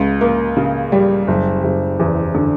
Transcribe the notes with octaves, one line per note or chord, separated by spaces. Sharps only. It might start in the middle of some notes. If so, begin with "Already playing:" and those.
Already playing: C#2
A#3
C#3
G3
F#1
F#1
E2
D3